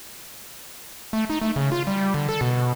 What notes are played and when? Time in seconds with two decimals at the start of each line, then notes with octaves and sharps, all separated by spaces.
1.13 A3
1.30 D#4
1.41 A3
1.56 C#3
1.72 F4
1.87 G3
2.14 D3
2.29 A4
2.41 B2